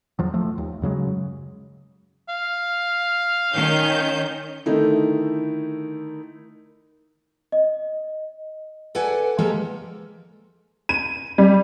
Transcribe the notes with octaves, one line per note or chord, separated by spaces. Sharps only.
E2 F3 F#3
F3 A3
D#2
F#2 C#3 F#3 G#3
F5
D#3 C#4 G6
D3 D#3 A3 D#4 E4
D#5
A4 B4 D5 F#5 G#5
F3 G#3 A#3 G4 A4 A#4
D#7
G3